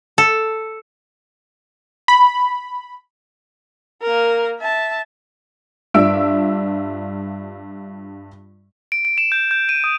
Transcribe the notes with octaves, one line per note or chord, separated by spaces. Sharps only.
A4
B5
A#3 A#4
E5 A5
G2 D4 F4 E5 E6 D7
D7
D7
E7
G6
G6
D#7
D#6